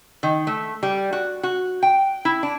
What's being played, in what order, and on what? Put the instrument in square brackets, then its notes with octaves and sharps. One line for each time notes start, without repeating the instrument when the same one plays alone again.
[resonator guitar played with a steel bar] D#3
A3
G3
F#4
F#4
G5
E4
D4